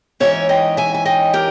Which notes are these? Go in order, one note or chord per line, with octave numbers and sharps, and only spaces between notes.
G#2 E3 A#3 C#4 C#5 E5
D#5 G5
E5 G#5
G#5
D#5 G5
G4 A#4